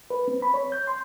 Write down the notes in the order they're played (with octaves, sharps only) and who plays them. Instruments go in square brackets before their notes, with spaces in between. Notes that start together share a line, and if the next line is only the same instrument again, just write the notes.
[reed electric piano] B4
C4
B5
C#5
G6
C6